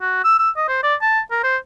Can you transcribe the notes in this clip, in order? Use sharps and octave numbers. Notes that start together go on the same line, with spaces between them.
F#4
E6
E6
D#5
C5
D5
A5
A#4
C5